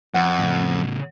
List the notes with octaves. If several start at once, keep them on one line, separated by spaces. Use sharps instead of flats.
F2 F#5
A2 C#3